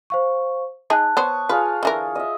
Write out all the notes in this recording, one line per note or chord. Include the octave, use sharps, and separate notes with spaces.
C5 F5 C#6
D#4 G#4 D#5 A5 F#6
B3 C5 C#5 C#6 D#6
F4 G#4 B4 F5
D3 E3 A#4
D#5 E5